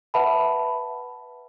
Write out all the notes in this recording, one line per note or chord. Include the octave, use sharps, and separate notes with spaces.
B4 E5 F#5 A5 B5